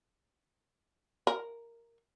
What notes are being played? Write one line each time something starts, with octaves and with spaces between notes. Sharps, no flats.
A#4